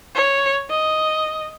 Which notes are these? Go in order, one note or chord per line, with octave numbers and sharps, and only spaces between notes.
C#5
D#5